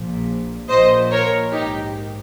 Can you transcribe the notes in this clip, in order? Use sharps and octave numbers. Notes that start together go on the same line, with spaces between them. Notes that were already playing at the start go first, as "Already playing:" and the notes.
Already playing: A#1 A#2 F3
A#1 A#2 F3 C5 D#5
A#4 C#5
A#1 G#2 D#3 D#4 G4